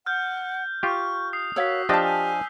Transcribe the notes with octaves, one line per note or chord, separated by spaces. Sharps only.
F#5 F6 G6
F4 G4 C#6
D#6 C7
F#4 A#4 C#5 F5 E6 B6
F3 D4 G4 D#5 A5 F6 G6
G#5